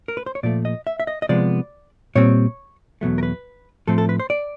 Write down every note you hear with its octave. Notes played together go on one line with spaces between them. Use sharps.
A#4
B4
C5
C#5
A#2 F3 A3 D5
D#5
E5
E5
D#5
D#5
C3 F3 G#3 B3 D5
A#2 G3 C4 C#5
E2 B2 F#3 A3
A#4
B4
A2 F3 A3 C4 A4
A4
B4
C5
D5